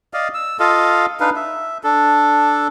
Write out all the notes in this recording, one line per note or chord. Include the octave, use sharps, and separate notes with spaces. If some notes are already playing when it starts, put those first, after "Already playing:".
D5 D#5 F5
E6
F4 A4 D#5 F5
D4 D#4 B4 F5
E5
D4 A4